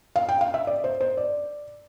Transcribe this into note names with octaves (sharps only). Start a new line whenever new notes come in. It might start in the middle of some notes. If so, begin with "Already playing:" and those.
F5
G5
F5
E5
D5
C5
C5
D5